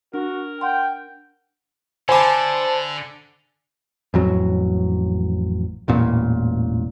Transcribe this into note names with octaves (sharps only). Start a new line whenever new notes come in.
D4 F#4 A#4
F#5 G5 C6
D3 C5 G#5 A5 B5 D6
A1 F2 F#3
E1 A1 A#2